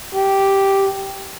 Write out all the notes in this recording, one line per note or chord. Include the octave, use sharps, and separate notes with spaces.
G4